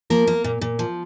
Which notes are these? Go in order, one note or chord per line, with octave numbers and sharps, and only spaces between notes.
F3 A#3 A#4
A#3
A#2
A#2
F3